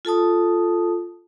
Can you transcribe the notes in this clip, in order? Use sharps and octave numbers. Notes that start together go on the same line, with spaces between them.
F4 A4 A5 D#6